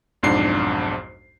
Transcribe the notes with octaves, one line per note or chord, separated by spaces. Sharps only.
B1 F2 G#2 D4 C7